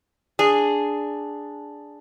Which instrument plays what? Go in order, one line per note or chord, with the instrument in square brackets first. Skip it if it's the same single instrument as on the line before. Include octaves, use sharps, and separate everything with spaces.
[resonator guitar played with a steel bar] D4 G#4